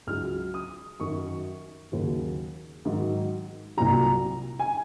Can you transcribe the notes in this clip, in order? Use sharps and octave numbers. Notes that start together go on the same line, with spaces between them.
C#2 C#3 F#3 F6
D#6
F#2 D#3 F#3 C#6
D#2 C#3 F#3
G#2 D#3 F#3
C2 A#2 F#3 A#5
G#5